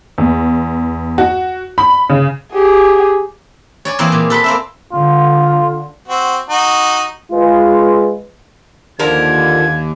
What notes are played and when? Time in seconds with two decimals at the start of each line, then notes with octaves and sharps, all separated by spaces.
0.18 E2
1.18 F#4
1.78 B5
2.10 C#3
2.53 G4 G#4
3.85 C#5 D5 G#5
3.99 E3 A#3 C4 G#4 A#4
4.12 A#2
4.30 A4 B4 B5 C6
4.44 A#3 C4 E5
4.93 D3 F4
6.08 C4 F#4
6.49 D#4 F#4
7.32 G#3 F4 B4
9.00 D#2 D3 F3 A#4 G#6